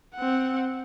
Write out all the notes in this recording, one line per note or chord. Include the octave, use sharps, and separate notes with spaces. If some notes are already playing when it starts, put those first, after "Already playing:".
C4 F#5